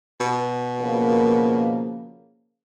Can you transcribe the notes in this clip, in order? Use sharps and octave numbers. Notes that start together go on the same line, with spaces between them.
B2
C#3 F3 A#3